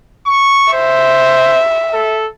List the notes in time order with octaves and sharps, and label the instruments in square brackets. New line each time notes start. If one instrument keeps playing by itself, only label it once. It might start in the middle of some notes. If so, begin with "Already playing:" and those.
[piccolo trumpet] C#6
[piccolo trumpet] C5 [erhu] E5
[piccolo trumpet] A4